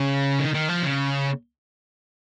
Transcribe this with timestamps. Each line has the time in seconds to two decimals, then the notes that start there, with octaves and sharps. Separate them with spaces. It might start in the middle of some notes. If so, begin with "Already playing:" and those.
Already playing: C#3
0.39 D#3
0.54 D#3
0.69 F3
0.82 C#3